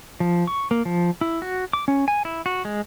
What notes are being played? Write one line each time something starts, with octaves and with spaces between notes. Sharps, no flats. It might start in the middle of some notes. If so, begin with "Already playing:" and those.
F3
C#6
A#3
F3
E4
F#4
D6
C#4
G#5
E4
F#4
G#3